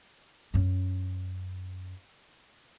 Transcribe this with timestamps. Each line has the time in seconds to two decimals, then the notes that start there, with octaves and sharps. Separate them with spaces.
0.54 F#2 C#4